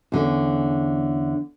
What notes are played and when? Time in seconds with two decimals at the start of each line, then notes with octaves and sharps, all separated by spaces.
0.12 E2 D3 C#4